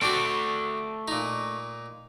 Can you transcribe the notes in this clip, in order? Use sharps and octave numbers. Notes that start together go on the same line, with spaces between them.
A3 C4 D4 F#4 D5
A#2 D#4